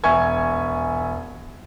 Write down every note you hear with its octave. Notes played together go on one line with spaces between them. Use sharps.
E1 E5 G#5 C#6 G#6